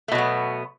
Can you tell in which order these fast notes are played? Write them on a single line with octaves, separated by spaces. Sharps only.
A3 B2 F#3 B3